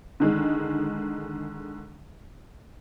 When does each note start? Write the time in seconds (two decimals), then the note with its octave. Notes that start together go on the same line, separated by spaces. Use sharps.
0.20 D3 D#3 G#3